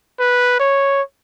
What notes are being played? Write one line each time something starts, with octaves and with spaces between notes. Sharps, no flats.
B4
C#5